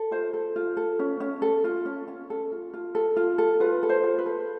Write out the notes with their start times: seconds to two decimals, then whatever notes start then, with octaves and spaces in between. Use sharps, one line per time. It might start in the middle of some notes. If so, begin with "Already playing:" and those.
Already playing: A4
0.11 F4 C5
0.33 A4
0.56 F4
0.77 A4
0.99 C#4
1.20 C#4
1.42 A4
1.64 F4
1.85 C#4
2.08 C#4
2.30 A4
2.52 F4
2.74 F4
2.95 A4
3.17 F4
3.38 A4
3.60 F4 B4
3.83 A4
3.89 C5
4.04 F4
4.18 B4
4.26 A4